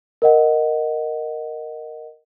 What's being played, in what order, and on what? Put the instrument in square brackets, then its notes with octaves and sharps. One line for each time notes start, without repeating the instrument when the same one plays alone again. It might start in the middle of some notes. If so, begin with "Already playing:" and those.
[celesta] A#4 D#5 F#5